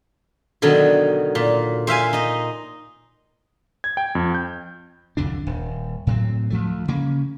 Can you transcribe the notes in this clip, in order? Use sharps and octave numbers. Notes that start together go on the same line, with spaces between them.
B2 D3 D#3 F#3
A#2
C5 E5 F5 G#5
D#4 D#5
G#6
G5
F2
G6
C2 F2 D3 D4
D#1
A2 F#3 C4
D2 F3 A3
C#3 A#3 C#4